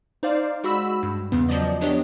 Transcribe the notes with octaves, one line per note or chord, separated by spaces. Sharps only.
D#4 C5 D5 F5
G#3 F#4 B5 E6
G2
E2 C#3 B3
F3 F#3 D5 D#5
F#3 B3 D4 G4 C#5 D#5